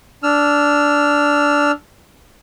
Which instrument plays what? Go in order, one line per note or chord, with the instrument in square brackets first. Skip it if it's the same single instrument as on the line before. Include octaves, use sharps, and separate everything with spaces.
[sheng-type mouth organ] D4 E6 F6